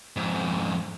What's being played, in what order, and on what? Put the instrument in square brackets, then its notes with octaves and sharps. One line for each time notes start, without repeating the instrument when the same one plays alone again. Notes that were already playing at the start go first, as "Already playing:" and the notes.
[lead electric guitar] F2 G#2